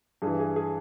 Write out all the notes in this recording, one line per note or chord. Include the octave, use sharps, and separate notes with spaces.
G2 E3 G#4
G#4
G#4